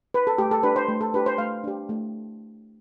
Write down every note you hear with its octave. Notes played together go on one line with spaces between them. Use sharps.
B4
A4
A3 G4
A4
D4 G4 B4
C5
A3
A4
D4 G4 B4
C5
A3 F5
D4 G4
A3